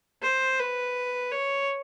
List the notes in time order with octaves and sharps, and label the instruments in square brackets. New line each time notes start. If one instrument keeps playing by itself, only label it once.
[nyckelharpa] C5
B4
C#5